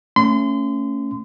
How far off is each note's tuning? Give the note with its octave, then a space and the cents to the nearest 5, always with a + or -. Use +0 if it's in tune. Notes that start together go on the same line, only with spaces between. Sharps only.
A3 +35 C#4 +0 C6 -30